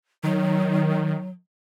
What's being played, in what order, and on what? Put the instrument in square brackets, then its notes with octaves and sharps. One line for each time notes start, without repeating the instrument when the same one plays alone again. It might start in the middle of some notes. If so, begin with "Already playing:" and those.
[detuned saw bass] D#3 [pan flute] F#3